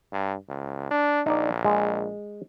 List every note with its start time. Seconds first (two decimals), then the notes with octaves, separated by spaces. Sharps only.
0.12 G2
0.48 C#2
0.91 D4
1.26 A#1 D#4 D5
1.65 G#3